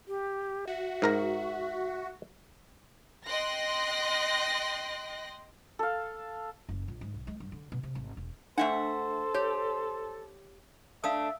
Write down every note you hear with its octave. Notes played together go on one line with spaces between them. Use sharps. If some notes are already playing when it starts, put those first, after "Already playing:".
G4
F#4 E5
G#2 A#4 A#5
D#5 G5 C6 F#6 A#6
A4 F5
F#1
A#1
G#2
B1
G#3
G2
D3
B2
C3
G#1
E1
A3 D4 A4 C5 E5 F#5
G4 C#5
A3 D4 E5 F5 D#6